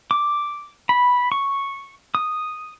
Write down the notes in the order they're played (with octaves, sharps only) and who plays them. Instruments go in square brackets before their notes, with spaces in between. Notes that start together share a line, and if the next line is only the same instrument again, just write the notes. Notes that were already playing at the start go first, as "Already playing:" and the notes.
[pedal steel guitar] D6
B5
C#6
D#6